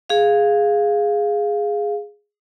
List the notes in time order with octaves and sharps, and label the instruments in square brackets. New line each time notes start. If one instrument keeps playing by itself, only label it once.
[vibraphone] G#4 F5